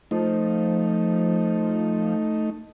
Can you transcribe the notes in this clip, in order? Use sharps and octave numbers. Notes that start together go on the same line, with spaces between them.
F3 A3 D#4